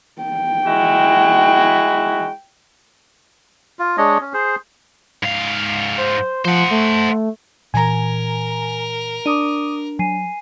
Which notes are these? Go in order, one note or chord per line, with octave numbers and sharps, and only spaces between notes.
G5
G#3 E4 F#4
F4
G#3 D4 C#5 D#5
C#4
G#4 C5
G#2 F5
C5
F3 C5 F#5
A3
A#2 E3 A#4 G#5 A#5
D4 D6 D#6 D#7
F#3 G#5 C7 D#7